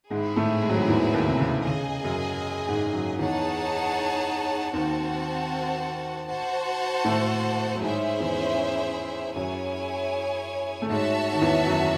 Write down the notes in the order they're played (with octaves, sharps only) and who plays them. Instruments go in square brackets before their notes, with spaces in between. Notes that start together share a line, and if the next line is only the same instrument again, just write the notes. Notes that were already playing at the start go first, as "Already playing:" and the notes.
[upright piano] G#2 G#3 [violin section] C4 E4 G#4
[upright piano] A2 A3
G#3
F#3
G#2 G#3
E2 E3
D#2 D#3
C3
C#3
[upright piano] C#3 [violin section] G#4 D#5 G#5
[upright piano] F#2 F#3
G#2 G#3
F#2 F#3
[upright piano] E2 E3 [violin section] D#4 G#4 C#5 F#5 A5
[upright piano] D#2 D#3 [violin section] C4 F#4 C5 F#5 A5
[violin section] F#4 C5 F#5 A5
[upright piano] A2 A3
F#3
[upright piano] G#2 G#3 [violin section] C#4 E4 G#4 C5 E5
[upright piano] E2 E3
[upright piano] F#2 F#3 [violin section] E4 G#4 C#5 G#5
[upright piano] A3
[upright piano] G#2 G#3 [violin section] F#4 C#5 E5 A5
[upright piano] D#3
E2 E3
F#2 F#3